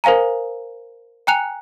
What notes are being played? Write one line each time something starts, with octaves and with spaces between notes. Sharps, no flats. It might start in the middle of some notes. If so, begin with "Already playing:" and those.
A#4 C5 F5 G#5 A#5
G5 G#5 A#5 F#6 C#7 F7